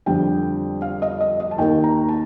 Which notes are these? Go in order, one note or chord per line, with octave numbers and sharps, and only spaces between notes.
F2 D3 G3 G5
F5
D#5
D#5
D#5
A5
D#2 D#3 A#3 G5
A#5
A5